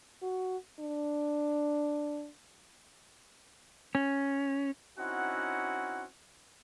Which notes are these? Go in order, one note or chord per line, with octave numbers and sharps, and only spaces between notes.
F#4
D4
C#4
C4 C#4 D#4 E4 F#4 F#5